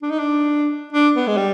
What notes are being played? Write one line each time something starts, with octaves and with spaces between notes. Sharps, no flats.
D4
D#4
D4
D4
B3
G#3
G3